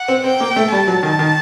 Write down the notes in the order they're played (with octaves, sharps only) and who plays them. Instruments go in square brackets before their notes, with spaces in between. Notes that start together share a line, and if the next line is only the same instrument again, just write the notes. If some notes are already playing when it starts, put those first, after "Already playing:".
Already playing: [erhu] F#5
[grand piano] C4
[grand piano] C4 [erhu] G5
[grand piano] A#3
A3
[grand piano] G3 [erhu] A5
[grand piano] F#3
D#3
D#3